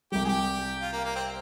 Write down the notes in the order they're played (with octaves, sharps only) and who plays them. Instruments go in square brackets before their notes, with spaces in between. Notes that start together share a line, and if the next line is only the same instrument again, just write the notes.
[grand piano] C2 C3 G3 [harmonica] G4
[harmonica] G#4
G4
F4
A#3
A#3
C4